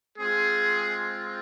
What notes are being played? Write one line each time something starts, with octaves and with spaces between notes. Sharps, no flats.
G#3 C4 F4 G#4